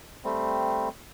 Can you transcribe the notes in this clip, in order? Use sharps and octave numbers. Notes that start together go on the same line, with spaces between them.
G3 A3 C4